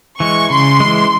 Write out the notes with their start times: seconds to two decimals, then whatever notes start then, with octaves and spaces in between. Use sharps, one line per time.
0.19 E3 G#3 C#6
0.50 C#3 C6
0.80 E3 G#3